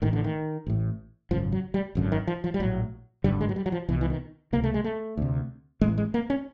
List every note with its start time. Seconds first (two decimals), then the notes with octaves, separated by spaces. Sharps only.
0.02 A1 A2 D#3
0.13 D3
0.24 D#3
0.67 A1 A2
1.31 G#1 F#2 C#3 F3
1.52 F#3
1.74 G3
1.95 G#1 F#2 D3
2.12 D#3
2.27 F3
2.44 F3
2.54 G3
2.60 A#1 A2 F#3
3.24 G#1 G2 D3 G3
3.41 G#3
3.49 F#3
3.56 G3
3.66 F#3
3.72 F3
3.89 C2 B2 E3
4.01 E3
4.10 D#3
4.53 C#2 C3 A#3
4.64 A3
4.74 G#3
4.84 A3
5.17 D2 C3
5.81 A1 A2 G#3
5.98 G#3
6.14 A#3
6.30 C#4